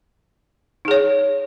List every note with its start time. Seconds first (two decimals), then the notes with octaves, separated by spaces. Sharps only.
0.85 D#4
0.88 G#4
0.91 C#5